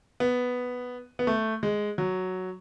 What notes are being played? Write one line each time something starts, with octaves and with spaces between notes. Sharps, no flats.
B3
B3
A3
G#3
F#3